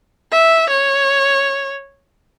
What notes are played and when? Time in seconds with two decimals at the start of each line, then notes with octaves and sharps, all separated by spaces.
0.31 E5
0.69 C#5